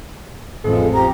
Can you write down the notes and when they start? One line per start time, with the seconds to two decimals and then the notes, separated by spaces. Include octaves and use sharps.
0.64 A1 F2 F3 G#3 A4
0.94 F3 G4 A#5